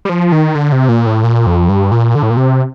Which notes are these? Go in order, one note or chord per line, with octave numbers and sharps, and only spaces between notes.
G3
F3
D#3
D3
C3
A#2
A2
A#2
F2
G2
A#2
D3
A2
A#2
C3